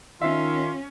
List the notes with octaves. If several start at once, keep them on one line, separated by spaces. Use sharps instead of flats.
D#3 C#4 D#4 F4 E5